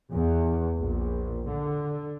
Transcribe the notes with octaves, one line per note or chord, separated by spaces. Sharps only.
E2
A#1
D3